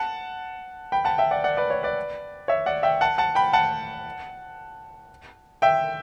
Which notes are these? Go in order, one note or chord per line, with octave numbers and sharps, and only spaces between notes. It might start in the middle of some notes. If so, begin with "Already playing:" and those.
Already playing: F#5 A5
G5 B5
F#5 A5
E5 G5
D5 F#5
D5 F#5
B4 D5
C#5
B4 D5
C#5 E5
D5 F#5
E5 G5
F#5 A5
F#5 A5
G5 B5
F#5 A5
E5 G5